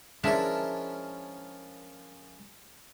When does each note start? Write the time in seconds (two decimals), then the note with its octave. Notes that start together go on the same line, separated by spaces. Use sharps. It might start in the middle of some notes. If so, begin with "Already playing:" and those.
0.24 F3 G#3 C#4 D4 E4 A#4